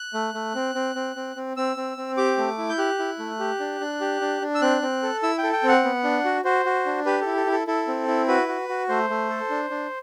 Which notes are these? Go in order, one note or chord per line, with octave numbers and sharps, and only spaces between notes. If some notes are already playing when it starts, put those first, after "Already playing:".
Already playing: F#6
A3
A3
C4
C4
C4
C4
C4
C4 E6
C4
C4
G4 D6
A3
E4
G6
G4 F#6
E4
A3
G4
D4
D4
G4
D4
D4
E6
C4 F#6
C4
A4
E4 E6
G5
A4
G5
C4
F#5
B3
D4
F#4
F#4 C5
F#4
D4
G4 B4
E4 A4
A4
E4
A4
E4 A4
C4
E4
F#4 B4
F#4
F#4
A3 C5
A3
A4
D4
D4